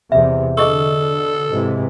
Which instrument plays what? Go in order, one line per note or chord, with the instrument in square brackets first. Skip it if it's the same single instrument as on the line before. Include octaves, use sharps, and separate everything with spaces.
[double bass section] E2 C3 [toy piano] E5
[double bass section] D3 [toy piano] G#4 D#5 C#6 [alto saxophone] A4
[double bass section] G#2 C3 E3